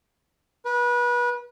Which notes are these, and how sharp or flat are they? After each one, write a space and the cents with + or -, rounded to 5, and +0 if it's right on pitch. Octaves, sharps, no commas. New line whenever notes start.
B4 -30